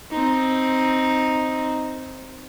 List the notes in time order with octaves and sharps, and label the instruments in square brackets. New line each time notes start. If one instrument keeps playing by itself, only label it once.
[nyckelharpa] C4 D#4